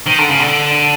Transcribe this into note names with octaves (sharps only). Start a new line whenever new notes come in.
D#3
D3
C#3
D3